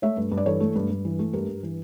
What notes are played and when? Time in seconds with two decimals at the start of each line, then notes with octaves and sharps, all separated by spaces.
0.02 A3 C#5 E5
0.17 G2
0.32 G2
0.37 D5
0.46 E3 A4 C#5
0.60 A3
0.76 G2
0.90 G2
1.05 E3
1.19 A3
1.33 G2 G4 A#4
1.48 G2
1.63 E3